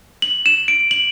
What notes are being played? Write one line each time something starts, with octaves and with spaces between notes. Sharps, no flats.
F#7
E7
D7
F#7